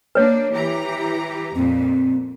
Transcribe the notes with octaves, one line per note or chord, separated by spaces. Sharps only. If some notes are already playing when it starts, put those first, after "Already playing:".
A#3 D4 B4 C#5
E3 G4 A#5
F2 A#2 C4